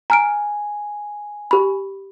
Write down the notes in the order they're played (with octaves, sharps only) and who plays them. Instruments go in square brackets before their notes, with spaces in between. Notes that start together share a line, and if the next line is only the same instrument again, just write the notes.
[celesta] G#5 [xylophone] A#5 F6 D7
[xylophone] G4 B5